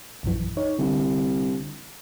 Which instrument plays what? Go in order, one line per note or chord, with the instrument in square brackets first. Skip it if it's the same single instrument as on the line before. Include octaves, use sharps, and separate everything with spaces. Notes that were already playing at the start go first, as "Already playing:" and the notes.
[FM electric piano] A#1 F#2 E3
D#4 C#5
[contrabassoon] C2 [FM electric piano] D3